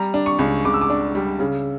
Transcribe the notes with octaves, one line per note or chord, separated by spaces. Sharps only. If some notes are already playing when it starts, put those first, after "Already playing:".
Already playing: G3 A#5
D4
C#6
C#2
C#2 D6
E6
D6
D4
G3
C#3